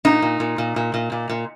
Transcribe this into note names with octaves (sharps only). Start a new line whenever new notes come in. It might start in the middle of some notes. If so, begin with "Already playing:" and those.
A#2 D#4
A#2
A#2
A#2
A#2
A#2
A#2
A#2